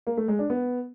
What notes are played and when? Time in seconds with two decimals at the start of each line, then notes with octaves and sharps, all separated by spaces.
0.07 A#3
0.17 A3
0.28 G#3
0.39 D4
0.50 B3